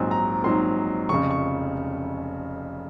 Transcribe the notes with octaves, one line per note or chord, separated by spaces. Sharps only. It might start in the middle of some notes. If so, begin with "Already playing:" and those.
Already playing: A#1 G#2 F#3 C4 D#4 G#5
A#5
A#1 G#2 F#3 C4 D#4 C6
F1 F2 C#3 C#6
C#6